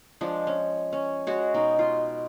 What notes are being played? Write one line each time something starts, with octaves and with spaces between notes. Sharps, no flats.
F3 G#3 D4
C#4
C#4
G#3 F#4 C#5
B2 D#4
F4